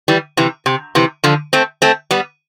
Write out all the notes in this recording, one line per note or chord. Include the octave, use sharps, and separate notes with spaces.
E3 G3
C3 E3
C3
C3 E3
D3 F3
A3 C4
A3 C4
G3 B3